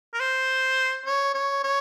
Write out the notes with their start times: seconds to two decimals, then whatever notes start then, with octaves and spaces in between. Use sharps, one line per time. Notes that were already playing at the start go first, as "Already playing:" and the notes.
0.14 A#4
0.20 C5
1.06 C#5
1.34 C#5
1.63 C#5